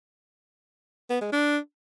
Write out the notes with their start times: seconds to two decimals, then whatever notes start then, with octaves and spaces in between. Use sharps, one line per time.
1.10 B3
1.21 G#3
1.33 D4